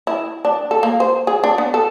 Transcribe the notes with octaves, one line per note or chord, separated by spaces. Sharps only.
E4
D4
A4
A#3
C5
G#4
D4
B3
A4